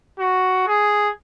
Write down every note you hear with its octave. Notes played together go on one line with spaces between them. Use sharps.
F#4
G#4